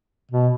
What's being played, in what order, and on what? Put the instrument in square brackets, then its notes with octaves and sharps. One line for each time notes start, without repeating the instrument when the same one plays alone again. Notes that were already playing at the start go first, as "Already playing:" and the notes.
[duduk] B2